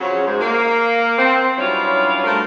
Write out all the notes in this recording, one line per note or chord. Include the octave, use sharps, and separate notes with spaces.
C#3 F3 F#3
G#2
A#3
C4
G2 F#3 G3 C#4 E4 F4
G2 A3 E4 A#4 C5 F5